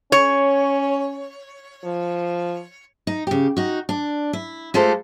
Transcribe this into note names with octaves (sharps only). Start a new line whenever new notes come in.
C#4 C#5
F3
D#4
C#3 G4
D#4 F#4
D4
E4
G#3 A3 F4 G4 A4 C5